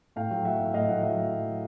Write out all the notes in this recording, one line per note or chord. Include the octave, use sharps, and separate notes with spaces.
A2 F5 G5
F#3
F#3 E5 F#5
A2
A2 D#5 F5
F#3 E5 F#5
F#3 E5 F#5